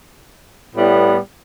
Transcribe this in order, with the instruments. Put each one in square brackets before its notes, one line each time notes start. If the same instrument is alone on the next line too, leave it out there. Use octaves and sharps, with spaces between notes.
[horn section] A2 G3 B3